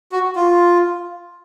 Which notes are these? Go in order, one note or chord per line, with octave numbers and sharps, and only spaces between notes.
F#4
F4